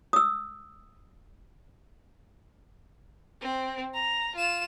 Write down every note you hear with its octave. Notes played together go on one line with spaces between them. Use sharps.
D#6 E6
C4
A#5
F4 E7